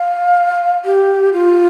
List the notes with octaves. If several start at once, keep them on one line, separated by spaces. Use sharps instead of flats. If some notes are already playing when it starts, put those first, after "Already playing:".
Already playing: F5
G4
F4